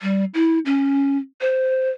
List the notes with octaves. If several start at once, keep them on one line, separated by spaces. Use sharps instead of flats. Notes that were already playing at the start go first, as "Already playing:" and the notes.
G3
E4
C#4
C5